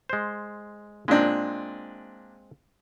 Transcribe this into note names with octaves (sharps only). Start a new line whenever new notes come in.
G#3 C5
A#2 G#3 C4 D4